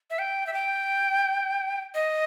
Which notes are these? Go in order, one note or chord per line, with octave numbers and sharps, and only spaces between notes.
E5
G5
E5
G5
D#5